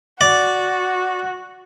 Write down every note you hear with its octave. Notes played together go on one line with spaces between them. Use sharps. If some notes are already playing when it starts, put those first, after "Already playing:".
F#4 D5